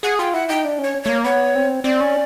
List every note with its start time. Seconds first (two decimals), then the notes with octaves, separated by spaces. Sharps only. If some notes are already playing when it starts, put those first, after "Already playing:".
0.03 G#4 F#5
0.19 F4 G5
0.34 E4 F#5
0.49 D#4 G5
0.65 D4
0.78 C#4
0.84 C#5
1.04 A3 C#5
1.09 A#3
1.24 B3 C#5
1.55 C4
1.84 C4 D5
2.00 C#4